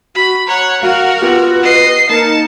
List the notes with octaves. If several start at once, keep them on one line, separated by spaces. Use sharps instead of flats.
F#4 B5
C#5 F#5 A#5
F#4 A#4 F5
B3 F4 G4 B4
D#5 C7
A#3 D#4 A#4 A5 C#7